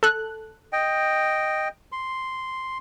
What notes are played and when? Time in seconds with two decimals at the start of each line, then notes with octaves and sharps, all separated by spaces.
0.03 A4 F#6
0.73 D#5 G5
1.92 C6